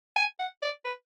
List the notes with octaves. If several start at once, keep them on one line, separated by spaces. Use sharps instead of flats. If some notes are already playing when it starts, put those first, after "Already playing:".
G#5
F#5
D5
B4